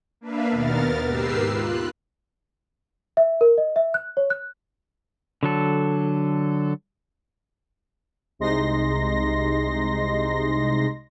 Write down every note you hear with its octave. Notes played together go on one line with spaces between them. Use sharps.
A#3 D4 B4 E5 F5
D#2 B2 B3 A#4 F6 A6
G#2 G4 A#4 B4 E6 C7
F4 F#6
E5
A#4
D#5
E5
F#6
C#5
F#6
D3 F#3 A4
C2 C3 G#3 D#4 C6 A#6